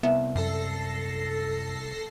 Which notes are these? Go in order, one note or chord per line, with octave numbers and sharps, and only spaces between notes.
C2 B3 E5
F#2 A4 A#6 C7